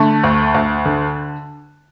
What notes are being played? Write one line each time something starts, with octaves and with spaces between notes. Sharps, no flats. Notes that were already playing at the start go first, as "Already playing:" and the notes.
Already playing: D3 A3
D2
D2
D3